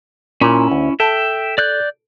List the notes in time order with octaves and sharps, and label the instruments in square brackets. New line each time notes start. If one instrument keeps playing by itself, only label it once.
[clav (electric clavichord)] A#2 [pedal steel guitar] C#4 E4
[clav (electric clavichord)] D2
[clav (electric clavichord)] A4 [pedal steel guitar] E5 G5
[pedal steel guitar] D5 F#6 G6